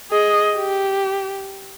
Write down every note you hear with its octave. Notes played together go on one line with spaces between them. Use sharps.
G#4 D#5
G4